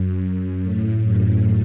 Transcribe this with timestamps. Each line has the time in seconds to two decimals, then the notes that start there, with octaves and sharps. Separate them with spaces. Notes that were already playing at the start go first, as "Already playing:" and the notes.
Already playing: F#2
0.22 F#2
0.63 A2
1.04 F#2